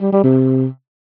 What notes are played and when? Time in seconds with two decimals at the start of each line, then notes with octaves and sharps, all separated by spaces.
0.01 G3
0.12 G3
0.23 C3